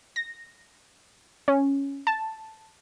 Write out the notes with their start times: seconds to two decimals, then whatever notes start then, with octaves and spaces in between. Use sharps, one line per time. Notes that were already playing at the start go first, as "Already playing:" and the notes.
0.16 A#6
1.48 C#4
2.07 A5